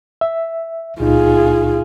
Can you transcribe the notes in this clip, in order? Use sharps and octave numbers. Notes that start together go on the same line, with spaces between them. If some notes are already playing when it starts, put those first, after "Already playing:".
E5
C#2 A#2 D#4 F4 G#4